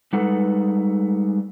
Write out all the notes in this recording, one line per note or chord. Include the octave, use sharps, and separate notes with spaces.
G3 G#3 D#4 A4 B4 F#5